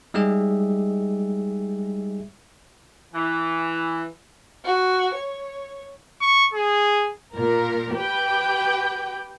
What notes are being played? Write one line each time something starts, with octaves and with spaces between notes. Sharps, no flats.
G3 G#3 D#4 G4 G#4 E5
E3
F#4
C#5
C#6
G#4
A#2 A#4
G4 B4 G5